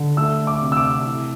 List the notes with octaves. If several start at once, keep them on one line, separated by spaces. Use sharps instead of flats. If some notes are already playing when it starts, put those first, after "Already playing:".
Already playing: D3
A3 E6
D6
C3
E6
D6
E3